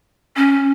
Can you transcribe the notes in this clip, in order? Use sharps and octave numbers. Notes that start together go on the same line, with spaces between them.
C#4